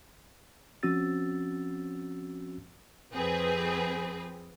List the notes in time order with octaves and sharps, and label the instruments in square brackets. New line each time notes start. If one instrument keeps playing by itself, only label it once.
[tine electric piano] F3 C4 C#4 F#4 E6 A6
[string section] F2 C4 G#4 B4